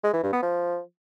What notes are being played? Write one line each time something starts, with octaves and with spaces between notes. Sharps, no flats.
G#3
E3
G2
B3
F3